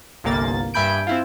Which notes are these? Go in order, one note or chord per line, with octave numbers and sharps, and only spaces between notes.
G1 C2 A#3 A6
G2 E5 G#5 B5 G6 D7
C4 E4 F4